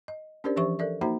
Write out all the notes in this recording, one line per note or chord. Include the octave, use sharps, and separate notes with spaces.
D#5
C#4 D4 G4 A#4 C5 D5
E3 F3 G4 C5 E5 C#6
A4 A#4 D5 E5
A#3 D#4 F#4 C5 E5 A#5